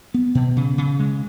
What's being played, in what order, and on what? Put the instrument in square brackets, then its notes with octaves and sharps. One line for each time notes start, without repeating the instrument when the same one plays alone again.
[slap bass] B3
B2
C#3
C#3
G#3